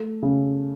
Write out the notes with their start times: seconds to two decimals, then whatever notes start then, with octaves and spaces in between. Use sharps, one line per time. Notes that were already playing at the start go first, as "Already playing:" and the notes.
Already playing: A3
0.23 C#3